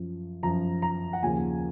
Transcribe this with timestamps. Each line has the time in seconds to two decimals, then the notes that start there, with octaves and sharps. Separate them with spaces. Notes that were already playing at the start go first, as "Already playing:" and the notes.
Already playing: F#2 F3
0.43 F#2 F3 A#5
0.82 A#5
1.13 F#5
1.23 D#2 C#3 F3 G#5